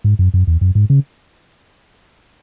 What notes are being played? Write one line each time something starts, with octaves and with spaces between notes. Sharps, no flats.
G#2
F#2
F#2
E2
F#2
G#2
C#3